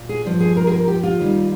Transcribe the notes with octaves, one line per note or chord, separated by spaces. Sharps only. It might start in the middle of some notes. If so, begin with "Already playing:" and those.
Already playing: A#2
G#4
G2 F3
G#4
A#4
G#4
A#4
G4
F4
D#2 D#3 G3